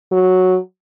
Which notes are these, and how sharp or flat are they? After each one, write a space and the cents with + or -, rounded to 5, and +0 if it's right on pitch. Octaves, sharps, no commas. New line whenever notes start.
F#3 -5